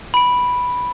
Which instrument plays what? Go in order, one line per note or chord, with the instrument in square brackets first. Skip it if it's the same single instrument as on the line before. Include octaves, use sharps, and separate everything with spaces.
[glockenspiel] B5 D7